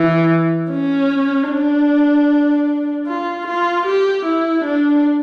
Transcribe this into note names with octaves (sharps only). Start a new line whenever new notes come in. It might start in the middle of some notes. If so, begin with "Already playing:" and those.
Already playing: E3
C#4
D4
F4
F4
G4
E4
D4